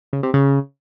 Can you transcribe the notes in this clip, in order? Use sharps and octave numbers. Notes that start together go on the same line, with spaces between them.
C#3
C3
C#3